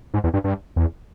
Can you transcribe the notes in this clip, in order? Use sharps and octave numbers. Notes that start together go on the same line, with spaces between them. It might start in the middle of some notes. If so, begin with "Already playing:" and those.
G#2
E2
G2
G2
E2